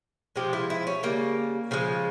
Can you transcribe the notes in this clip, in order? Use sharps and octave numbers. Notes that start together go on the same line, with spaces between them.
C3 F3 G#3 G4
E4
E4
C#4
C#3 G3 A#3
C#3 F3 G#3